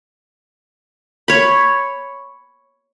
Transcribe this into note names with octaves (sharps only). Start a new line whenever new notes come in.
C#5 B5